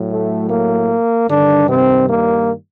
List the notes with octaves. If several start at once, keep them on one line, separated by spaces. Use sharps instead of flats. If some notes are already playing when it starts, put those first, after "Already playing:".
Already playing: A2 F#3
A3
A#3
G2 D3 D#3 G3 D4
C3 C4
A#3